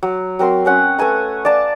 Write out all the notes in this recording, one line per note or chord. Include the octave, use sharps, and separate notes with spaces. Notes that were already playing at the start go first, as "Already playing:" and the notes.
F#3
F#3 C4 A#4 C6
C4 C#4 F#5 G#5
A3 B4 G#5 A#5
D5 F5 A5 A#5